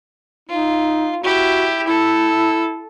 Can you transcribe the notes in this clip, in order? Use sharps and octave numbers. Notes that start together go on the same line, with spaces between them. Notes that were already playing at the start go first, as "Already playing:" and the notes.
D#4 F4
E4 F#4 G4
E4 A4